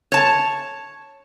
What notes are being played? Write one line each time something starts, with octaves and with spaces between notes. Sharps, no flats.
C#5 A5